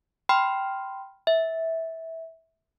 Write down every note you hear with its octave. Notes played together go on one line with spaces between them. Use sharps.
G5 B5 C6 F6
E5